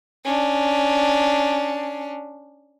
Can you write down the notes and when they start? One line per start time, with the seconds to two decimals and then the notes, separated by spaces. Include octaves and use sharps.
0.25 C#4 D4